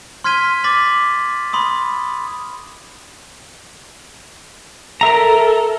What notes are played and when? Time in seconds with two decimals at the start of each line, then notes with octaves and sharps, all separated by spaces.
0.24 C6 F6 G#6 B6 D#7 G7
0.64 D6 A6 B6 F#7
1.53 B5 C6 D#6
5.01 A4 A#4 E5 A#5